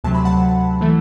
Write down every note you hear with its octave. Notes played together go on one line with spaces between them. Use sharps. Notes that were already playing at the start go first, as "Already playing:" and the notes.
D2 C3 F#3 A5
B5
F#5 A5
E3 A3